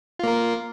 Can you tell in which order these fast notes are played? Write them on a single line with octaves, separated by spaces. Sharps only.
F4 A#3 A#4